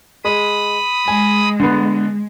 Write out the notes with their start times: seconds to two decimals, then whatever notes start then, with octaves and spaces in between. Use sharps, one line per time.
0.25 G#3 B5 D#6
1.08 G#3 G#5
1.60 D3 B3